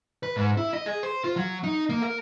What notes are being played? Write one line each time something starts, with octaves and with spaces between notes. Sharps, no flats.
B4
G#2
E4
D#5
G#4
C5
F4
F#3
D#4
A#3
A#4